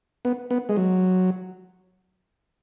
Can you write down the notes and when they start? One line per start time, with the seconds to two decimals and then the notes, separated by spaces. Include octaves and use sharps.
0.25 B3
0.51 B3
0.69 G#3
0.77 F#3